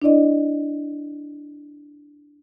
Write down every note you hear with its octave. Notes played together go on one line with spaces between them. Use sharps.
D4 E4 D5 D#5